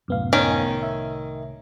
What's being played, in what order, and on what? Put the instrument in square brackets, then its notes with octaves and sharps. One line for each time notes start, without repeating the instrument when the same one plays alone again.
[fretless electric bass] C2 A2 [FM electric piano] F#2 B3 F5
[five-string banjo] D#3 C#4
[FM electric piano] E5